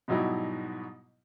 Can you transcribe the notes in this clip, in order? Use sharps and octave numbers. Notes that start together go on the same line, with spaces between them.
G#2 B2 F#3 G3 D#4 E4